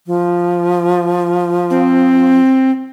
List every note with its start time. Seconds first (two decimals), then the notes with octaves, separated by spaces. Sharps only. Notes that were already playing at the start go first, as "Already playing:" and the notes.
0.07 F3
1.70 C4